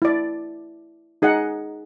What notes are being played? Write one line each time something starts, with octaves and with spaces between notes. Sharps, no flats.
E4 D5
D#4 G#4 D#5 F#5